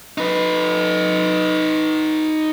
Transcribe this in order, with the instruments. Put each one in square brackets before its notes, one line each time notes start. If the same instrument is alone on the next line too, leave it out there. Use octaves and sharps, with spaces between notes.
[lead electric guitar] D#4 B4